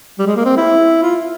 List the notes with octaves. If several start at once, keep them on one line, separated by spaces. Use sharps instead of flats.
G3
G#3
A#3
C4
E4
F4